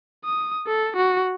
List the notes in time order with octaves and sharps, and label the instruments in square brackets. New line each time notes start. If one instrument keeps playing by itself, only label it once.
[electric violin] D#6
A4
F#4